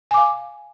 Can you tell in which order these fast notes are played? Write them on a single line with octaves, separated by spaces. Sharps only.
G#5 D6 F5